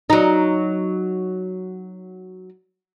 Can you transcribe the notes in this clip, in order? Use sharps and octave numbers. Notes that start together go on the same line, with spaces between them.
F#3 D#4